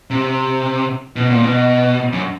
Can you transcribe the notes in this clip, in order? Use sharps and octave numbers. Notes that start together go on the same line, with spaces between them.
C3
B2
A#2
B2
F#2